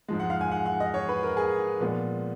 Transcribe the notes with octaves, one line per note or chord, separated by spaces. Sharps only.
G#2 F3 G#3
F#5
F5
G#5
F#5
F#5
D#5
C#5
B4
A#4
G#4
A#2 F3 G#3 B3